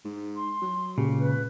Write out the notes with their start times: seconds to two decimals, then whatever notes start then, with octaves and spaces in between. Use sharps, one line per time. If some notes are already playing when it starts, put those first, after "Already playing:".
0.05 G#2
0.36 C6
0.62 F#3
0.98 C#2 A#2 C#3 G4
1.20 B4